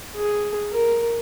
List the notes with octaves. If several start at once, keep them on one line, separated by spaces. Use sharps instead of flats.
G#4
A#4